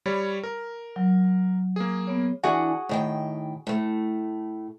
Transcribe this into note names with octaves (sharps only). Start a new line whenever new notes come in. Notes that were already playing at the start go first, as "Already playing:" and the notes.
G3 C#5 B5
A#4
F#3
A#3 G#4
B3 C#5
E3 D4 F#4 G#4 F#5
A2 D#3 G5
A2 A3